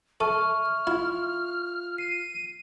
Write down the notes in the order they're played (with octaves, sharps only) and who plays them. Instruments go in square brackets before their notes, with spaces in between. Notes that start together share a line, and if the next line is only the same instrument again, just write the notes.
[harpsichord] A4 [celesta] E5 C#6 D#7 [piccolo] F6
[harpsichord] E4 [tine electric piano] F4
[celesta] C7 [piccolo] D#7